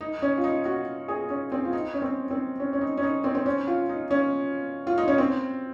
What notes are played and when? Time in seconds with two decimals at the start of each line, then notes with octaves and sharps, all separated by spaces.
0.01 D#4
0.22 C#4
0.37 F4
0.44 D#4
0.65 F#4
1.08 G#4
1.30 C#4
1.52 C4
1.65 F4
1.73 D#4
1.94 C#4
2.02 C4
2.31 C4
2.60 C#4
2.73 C#4
2.81 D#4
2.97 C#4
3.03 D#4
3.24 C4
3.35 C4
3.46 C#4
3.67 F4
3.89 D#4
4.11 C#4
4.87 F4
4.98 D#4
5.08 C#4
5.18 C4